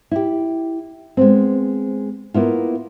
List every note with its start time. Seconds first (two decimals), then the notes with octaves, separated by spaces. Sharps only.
0.11 E4 G4
1.17 G#3 B3 C4
2.34 A#3 B3 E4 F4